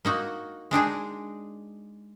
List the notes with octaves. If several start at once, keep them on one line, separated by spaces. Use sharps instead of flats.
A#3 D#4 F#4
G#3 D4 D#4 G#4